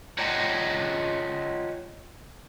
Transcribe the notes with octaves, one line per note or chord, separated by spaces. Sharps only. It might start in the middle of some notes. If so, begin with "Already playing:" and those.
F4 C#5 D#5 F#5 G5 A5